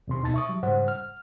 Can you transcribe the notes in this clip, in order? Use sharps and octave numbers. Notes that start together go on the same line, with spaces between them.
E2 C3 C6
D2 B2 D#4 A5 A6
E5 C#6 D#6
F#3 G3
G#2 C#3 G3 C5 F#5
F6